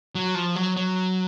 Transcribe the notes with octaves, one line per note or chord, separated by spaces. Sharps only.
F#3
F3
F#3
F#3